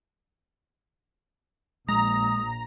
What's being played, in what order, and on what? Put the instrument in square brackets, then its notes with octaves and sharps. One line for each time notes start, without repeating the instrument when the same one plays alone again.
[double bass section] A#1 [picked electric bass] G#3 [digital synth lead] A#5 [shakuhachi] D#6